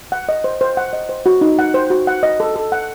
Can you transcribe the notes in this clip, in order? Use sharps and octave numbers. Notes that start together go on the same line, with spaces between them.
F#5
D#5
C5
C5
F#5
D#5
C5
F#4
D#4
F#5
C5
F#4
F#5
D#5
A4
A4
F#5